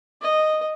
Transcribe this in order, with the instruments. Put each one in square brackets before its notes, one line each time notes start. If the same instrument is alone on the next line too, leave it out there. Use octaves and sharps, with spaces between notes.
[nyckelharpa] D#5